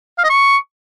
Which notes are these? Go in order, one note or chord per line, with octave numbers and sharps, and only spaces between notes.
F5
D#5
C#6